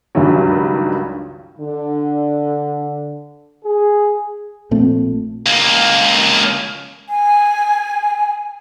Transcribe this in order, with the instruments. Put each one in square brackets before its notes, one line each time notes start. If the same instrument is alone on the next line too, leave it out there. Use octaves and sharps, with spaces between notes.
[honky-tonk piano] C#2 G2 D#3 F#3
[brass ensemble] D3
G#4
[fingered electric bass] A#1 A#2 A3 C4
[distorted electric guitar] C#2 A#3
[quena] G#5